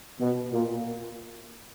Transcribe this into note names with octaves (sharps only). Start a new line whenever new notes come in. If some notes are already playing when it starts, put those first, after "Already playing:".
B2
A#2